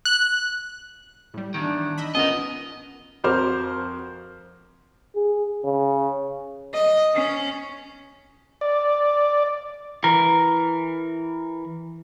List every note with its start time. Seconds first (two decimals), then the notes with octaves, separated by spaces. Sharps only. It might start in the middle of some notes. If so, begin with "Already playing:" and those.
0.05 F#6
1.34 A2 G3
1.54 E2 D#3 D4
1.98 D#5 E5 B5
2.15 G#1 A#2 B3 C#4 F4 A#4 D#5
3.24 F2 F#4 A#4 C5 D6 F6
5.15 G#4
5.65 C#3
6.74 D#5
7.15 C#4
8.61 D5
10.04 E3 A#4